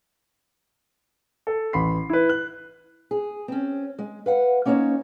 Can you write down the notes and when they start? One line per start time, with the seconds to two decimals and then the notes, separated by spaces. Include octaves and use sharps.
1.47 A4
1.73 A1 B5 C6 C7
2.09 E4 B4
2.29 F#6
3.11 G#4
3.48 C4 C#4
3.99 G#3
4.26 B4 F5 F#5
4.65 A#3 C#4 D#4 C5 C#5